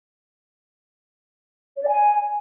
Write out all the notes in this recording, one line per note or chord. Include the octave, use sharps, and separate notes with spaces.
C#5
D5
G#5